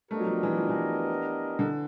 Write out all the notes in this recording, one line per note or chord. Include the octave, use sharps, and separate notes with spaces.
A3 B3 D4 G4 A#4 D#5
F#3
F3
E3
F3
E3
D3